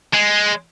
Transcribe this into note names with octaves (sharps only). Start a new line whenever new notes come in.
G#3